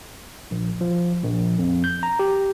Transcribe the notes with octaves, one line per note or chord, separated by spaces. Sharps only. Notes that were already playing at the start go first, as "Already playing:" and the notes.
A#1
F3
A#1
F2
G6
A#5
G4